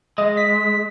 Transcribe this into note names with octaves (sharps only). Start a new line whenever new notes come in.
G#3 D#5
B6